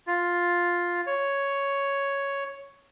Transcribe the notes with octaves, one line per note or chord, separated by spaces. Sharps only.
F4
C#5